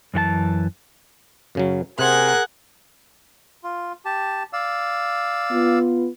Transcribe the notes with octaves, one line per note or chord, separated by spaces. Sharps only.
F#2 E3 F#4 A5
F#2 C#3 F#3
C3 G#4 A#4 C5 F#5 G#5 F#6
F4
G4 A5
D5 F5 E6
B3 F4